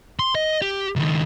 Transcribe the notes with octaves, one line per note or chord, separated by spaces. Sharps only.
C6
D#5
G4
C#2 D#3